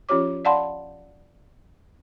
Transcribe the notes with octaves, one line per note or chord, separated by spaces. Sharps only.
F3 C#4 F4 G4 C#5 D6
D5 F5 F#5 A5 B5 C6